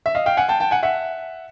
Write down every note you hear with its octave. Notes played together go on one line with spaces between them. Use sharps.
E5
D#5 F5
F5 G5
F#5 G#5
G5 A5
G5 A5
F#5 G#5
E5 F#5